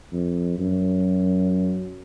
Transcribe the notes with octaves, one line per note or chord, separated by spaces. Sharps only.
F2
F#2